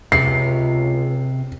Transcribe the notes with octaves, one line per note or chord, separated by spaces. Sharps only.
C#2 C3 C7